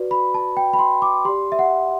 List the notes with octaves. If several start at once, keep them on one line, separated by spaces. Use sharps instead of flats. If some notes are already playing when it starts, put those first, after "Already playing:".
Already playing: F#4 B4 D5
B5
A5
G5
B5
C6
D6
G4 D5 C6
E5
F#5